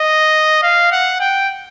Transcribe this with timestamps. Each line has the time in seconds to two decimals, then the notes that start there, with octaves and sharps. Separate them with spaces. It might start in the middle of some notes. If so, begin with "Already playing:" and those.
Already playing: D#5
0.63 F5
0.92 F#5
1.20 G5